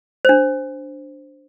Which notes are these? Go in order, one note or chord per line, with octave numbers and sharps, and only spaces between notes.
D4 C5